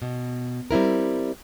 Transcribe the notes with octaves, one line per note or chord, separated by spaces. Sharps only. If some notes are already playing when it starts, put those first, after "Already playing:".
B2
G3 C4 E4 A#4